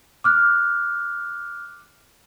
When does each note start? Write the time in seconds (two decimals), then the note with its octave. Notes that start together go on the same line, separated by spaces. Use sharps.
0.24 D6 F6 F#6